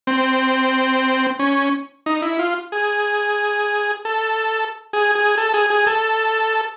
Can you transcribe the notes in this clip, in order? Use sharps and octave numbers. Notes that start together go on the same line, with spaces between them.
C4
C#4
D#4
E4
F4
G#4
A4
G#4
G#4
A4
G#4
G#4
A4